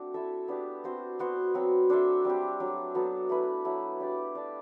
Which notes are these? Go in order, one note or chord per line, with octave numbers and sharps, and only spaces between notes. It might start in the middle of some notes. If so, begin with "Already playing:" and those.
Already playing: A3 C4 D4 F#4
E4 A4 E5
B3 D4 G4
C4 F#4 C5
B3 F#4 C5
F#3 C4 F#4
D4 A4 C5 E5
G3 C4 G4
F#3 A3 D4
F#3 B3 F#4 A4
A3 E4 B4
F#3 A3 E4
D4 G4 D5
D4 A4 D5